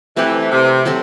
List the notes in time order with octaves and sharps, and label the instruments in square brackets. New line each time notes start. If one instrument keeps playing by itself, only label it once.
[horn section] E3 [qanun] A3 C4 G4 B4
[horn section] C3
[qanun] F#3 C4 F#4 A4